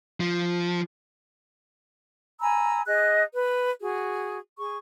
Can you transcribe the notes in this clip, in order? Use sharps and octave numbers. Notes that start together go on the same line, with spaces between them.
F3
G#5 A#5 B5 E6
G#4 D#5 F#6
B4
F#4 G#4
G#4 C#6